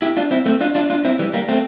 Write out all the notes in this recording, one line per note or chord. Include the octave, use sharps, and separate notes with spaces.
E4 G4
D4 F4
C4 E4
A3 C4
D4 F4
D4 F4
D4 F4
C4 E4
E3 G3
G3 A#3
A3 C4